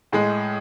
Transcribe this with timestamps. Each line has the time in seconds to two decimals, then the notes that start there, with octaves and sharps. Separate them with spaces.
0.12 A2 G#3 G#4